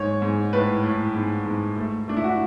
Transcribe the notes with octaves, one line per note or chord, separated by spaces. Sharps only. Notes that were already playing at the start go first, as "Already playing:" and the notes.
Already playing: G#2 G#3 C#5
G#2
A2 B4
A2
G#2
G#2
A3
A3 D4
E4
F#4